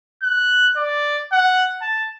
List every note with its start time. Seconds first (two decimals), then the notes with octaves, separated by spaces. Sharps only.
0.23 F#6
0.77 D5
1.32 F#5
1.82 A5